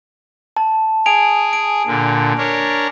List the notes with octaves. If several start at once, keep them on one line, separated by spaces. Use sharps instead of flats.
A5
G#4 G#5 D7 F7
D7
A#2 D3
D4 A#4 C#5